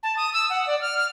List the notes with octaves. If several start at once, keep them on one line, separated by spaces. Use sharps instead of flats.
A5
D#6
E6
F#5
D5
F6
F6